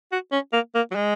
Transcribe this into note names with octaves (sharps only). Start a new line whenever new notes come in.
F#4
C#4
A#3
A#3
F#3
G#3